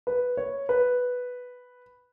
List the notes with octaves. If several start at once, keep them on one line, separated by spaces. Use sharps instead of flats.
B4
C#5
B4